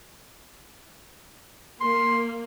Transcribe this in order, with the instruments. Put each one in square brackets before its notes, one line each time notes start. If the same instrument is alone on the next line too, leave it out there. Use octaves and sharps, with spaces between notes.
[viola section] A#3 [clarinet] C6